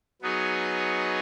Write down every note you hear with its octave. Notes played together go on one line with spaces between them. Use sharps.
F#3 B3 D#4 G#4 C#5